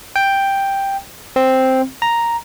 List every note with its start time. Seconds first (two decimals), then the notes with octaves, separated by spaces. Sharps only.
0.16 G5
1.36 C4
2.02 A#5